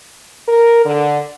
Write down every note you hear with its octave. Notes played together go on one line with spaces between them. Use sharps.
A#4
D3